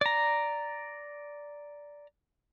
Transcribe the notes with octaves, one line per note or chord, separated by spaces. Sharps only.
D5 A#5